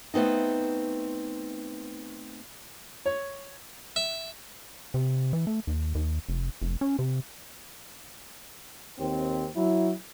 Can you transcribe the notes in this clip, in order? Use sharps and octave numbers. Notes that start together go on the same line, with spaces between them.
A3 B3 C4 D#4
C#5
E5
C3
E3
A3
D#2
D#2
F1
F1
C#4
C3
D#2 C4
F#3 E4